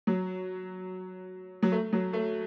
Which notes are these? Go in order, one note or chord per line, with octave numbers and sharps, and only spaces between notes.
F#3
F#3
A3
F#3
A3